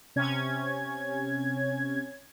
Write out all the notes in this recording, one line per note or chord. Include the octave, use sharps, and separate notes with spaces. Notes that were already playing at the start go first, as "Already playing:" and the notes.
C3 C#4 G#6